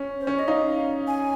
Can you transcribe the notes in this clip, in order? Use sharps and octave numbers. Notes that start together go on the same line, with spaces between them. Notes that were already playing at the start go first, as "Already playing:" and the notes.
Already playing: C#4
C5
C#4 C#5
D#5
D#4 F5
G#5